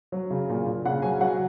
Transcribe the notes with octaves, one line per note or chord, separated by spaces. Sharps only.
F#3
C#3
A#2
A#2
C#3 F#5
F#3 G#5
F#3 F#5